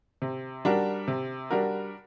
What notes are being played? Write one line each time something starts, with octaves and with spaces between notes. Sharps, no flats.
C3
G3 D4 F#4 A#4
C3
G3 D4 F#4 A#4